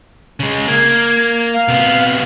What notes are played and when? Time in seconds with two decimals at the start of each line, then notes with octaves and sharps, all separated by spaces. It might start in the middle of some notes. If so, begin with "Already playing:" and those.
0.40 C#3 G#3
0.68 A#3 G#6
1.54 F5
1.68 C3 B3